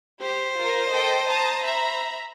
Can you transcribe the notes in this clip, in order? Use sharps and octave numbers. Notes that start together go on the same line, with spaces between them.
G4 C5
F4 A#4
A4 D#5 G5
A5 A#5 D#6
E5 A#5 B5